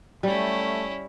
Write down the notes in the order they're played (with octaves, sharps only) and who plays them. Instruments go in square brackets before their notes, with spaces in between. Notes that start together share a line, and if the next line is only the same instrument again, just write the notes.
[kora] G3 [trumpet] A3 [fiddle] C#4 E4